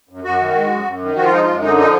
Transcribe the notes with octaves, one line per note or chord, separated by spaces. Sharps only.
F#2
F#2 F#4
D#3
G#3
F#2
F#2
D#3
F3 F#4
F4
G#3 D#4
F4
F#2
D3 D#4
F3 D#4